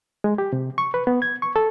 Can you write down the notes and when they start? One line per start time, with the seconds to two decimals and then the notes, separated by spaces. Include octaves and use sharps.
0.24 G#3
0.38 G4
0.53 C3
0.78 C#6
0.94 B4
1.07 B3
1.22 G#6
1.42 C#6
1.56 A4